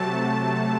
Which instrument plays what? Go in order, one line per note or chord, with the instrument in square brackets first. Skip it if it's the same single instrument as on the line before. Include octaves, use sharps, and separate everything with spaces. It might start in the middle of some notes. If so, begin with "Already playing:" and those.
Already playing: [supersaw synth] C3 F#3 A3 A5